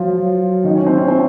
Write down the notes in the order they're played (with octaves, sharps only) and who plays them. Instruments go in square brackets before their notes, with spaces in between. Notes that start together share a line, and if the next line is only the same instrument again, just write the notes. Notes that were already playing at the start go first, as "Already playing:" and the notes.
Already playing: [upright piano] F3 F4 [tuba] F#3
[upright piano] D#3 D#4
C#4
C4
C#4
C4